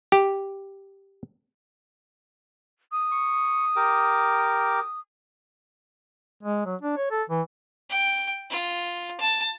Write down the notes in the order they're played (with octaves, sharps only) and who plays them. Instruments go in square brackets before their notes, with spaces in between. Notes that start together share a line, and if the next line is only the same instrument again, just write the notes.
[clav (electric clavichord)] G4
[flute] D#6
[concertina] C#6
G4 A#4 D6
[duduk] G#3
F#3
D4
C#5
A4
E3
[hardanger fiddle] G5
F4
A5